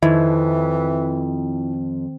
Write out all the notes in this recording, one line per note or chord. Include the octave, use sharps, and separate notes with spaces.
F2 D#3 E3 E4